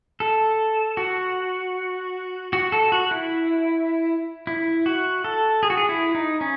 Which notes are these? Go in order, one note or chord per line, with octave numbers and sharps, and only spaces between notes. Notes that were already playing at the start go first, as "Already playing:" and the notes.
A4
F#4
F#4
A4
F#4
E4
E4
F#4
A4
G#4
F#4
G#4
E4
D#4
C#4